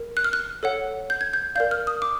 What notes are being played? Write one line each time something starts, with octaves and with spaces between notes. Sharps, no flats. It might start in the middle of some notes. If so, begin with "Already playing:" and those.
Already playing: A#4
F#6
F6
F#6
A4 C#5 F#5
G6
G#6
G6
A#4 D5 F5 G6
F6
D#6
D6